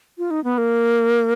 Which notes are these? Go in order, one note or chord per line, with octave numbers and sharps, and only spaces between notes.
F4
D#4
B3
A#3